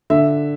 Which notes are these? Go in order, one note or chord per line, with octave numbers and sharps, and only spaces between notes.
D3 E5